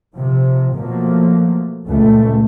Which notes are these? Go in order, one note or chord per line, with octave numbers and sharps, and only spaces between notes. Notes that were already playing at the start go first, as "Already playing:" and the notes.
C3 F3
B2 F3 F#3 A3 A#3
C#2 A#2 A3